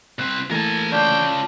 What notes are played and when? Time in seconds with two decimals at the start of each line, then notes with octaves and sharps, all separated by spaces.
0.19 C2 C4 B4
0.51 E3 A3 A#3 A#4 G#5 A5
0.92 C#4 D4 F4 G5